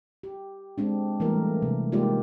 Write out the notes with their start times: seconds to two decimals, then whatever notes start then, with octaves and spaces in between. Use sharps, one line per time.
0.23 G4
0.78 G#3 C4 D4
1.20 E3 G3 A3 A#3 A#4
1.62 C3
1.92 G#3 A#3 D#4 F4 G4 D5